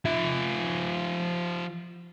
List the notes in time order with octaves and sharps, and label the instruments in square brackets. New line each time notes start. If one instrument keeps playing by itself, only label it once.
[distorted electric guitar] F3 E5